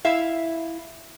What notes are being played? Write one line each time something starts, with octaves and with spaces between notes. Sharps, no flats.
E4 E5 F5